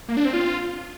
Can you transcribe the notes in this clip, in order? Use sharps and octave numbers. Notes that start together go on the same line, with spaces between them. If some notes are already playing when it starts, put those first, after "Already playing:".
A#3
D4
C4
F4